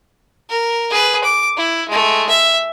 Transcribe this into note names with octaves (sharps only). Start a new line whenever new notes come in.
A#4
G#4 B4
D6
E4
G#3 A3
E5